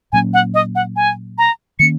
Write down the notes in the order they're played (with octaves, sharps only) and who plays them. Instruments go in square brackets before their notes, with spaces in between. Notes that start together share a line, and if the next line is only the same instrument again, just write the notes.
[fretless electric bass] A#2 F#3 A#3 C#4 [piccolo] G#5
[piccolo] F#5
D#5
F#5
G#5
A#5
[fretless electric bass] D#3 A#3 C#4 [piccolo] C#7